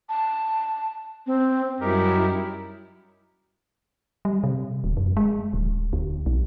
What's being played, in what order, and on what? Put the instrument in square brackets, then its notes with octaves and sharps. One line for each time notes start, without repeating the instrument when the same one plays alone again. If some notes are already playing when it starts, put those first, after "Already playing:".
[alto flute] A5
C4
[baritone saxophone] F#2 [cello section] G3 E4 [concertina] D#4 G4 A#4
[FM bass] G3
C3
D#1
F#2
G#3
D1
D2
B1